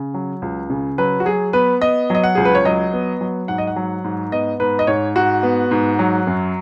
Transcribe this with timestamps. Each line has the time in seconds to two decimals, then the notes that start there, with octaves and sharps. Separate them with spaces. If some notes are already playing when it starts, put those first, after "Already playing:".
Already playing: C#3
0.14 F#3
0.42 C#2
0.70 C#3
0.98 F#3 B4
1.20 F#4
1.25 F#3 G#4
1.53 B3 B4
1.81 B3 D#5
2.10 F#3 D#5
2.23 F#5
2.35 C#2 G#4
2.45 B4
2.55 C#5
2.65 F#3 D#5
2.93 B3
3.21 F#3
3.48 G#2 F#5
3.58 D#5
3.67 F#5
3.76 F#3
4.04 G#2
4.32 B3 D#5
4.60 G#2 B4
4.79 D#5
4.87 G#2 C#5
5.15 G#2 F#4
5.43 B3
5.71 G#2
5.99 F#3
6.27 F#2